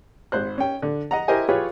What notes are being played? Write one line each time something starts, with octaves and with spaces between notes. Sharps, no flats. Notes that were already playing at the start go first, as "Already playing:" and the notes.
G#1 C5 F#6
C#4 G5
D3
D#5 F#5 A#5
E4 G4 A#4 C5 D#5 G#5
F4 G4 G#4 B4 C#5